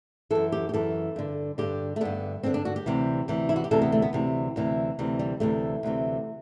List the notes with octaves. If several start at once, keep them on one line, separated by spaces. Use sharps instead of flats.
F#2 E3 A4
G4
G4
F#2 E3 A4
G2 D3
G2 D3 G4
A3
G2 D3 B3
G2 D3 C4
D4
F#4
G4
D2 C3 E3
D2 C3 E3
E4
F#4
G4
D2 C3 E3 A4
B3
A3
B3
D2 C3 E3
D2 C3 E3
D2 C3 E3
G3
D2 C3 E3 A3
D2 C3 E3